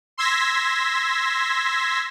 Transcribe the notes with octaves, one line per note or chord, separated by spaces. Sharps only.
C6 E6 G#6 A#6 B6